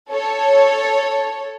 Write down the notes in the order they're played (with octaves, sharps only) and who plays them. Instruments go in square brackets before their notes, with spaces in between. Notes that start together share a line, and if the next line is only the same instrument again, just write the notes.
[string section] A4 C#5